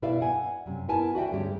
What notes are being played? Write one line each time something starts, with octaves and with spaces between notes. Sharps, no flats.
B2 E4 B4 D5 E5 F5
F#5 G#5
F#2 C3
B3 E4 A#4 G#5 A5
F#4 D5 E5 G5
D2 G2 G#3 C#4 G4